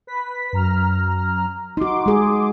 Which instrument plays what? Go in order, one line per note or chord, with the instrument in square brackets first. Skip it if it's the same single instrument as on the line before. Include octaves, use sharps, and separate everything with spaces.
[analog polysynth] B4 B6
F#2 A#5 F6
[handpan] D#4 F#4 [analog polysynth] C6 D6
[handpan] G#3 G#4